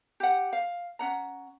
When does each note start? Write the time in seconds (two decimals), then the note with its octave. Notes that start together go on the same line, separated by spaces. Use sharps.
0.20 G4 F#5
0.53 F5
0.99 C#4 F#5 A#5